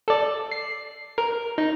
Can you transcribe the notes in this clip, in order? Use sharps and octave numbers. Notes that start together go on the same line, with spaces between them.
A4 D5
C7
A#4
D#4